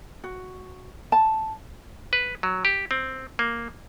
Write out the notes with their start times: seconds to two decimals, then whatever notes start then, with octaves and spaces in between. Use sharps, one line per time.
0.24 F#4
1.12 A5
2.13 B4
2.43 F#3
2.65 G4
2.91 C4
3.39 A#3